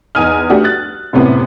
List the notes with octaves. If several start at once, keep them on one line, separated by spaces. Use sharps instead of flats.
E2 D#4 G#5 D#6 F6
A3 D4 F#4 G4
F#6 A6
F#2 A2 C3 B3 C4 E4